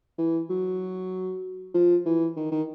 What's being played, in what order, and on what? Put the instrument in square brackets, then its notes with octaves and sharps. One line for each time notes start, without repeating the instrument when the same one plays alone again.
[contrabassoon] E3
F#3
F3
E3
D#3
D#3